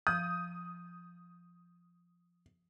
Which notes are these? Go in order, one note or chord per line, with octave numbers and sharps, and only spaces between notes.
F3 D#6 G6